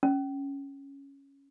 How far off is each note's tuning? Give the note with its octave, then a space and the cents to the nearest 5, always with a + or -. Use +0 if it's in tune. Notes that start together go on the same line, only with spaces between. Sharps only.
C#4 +0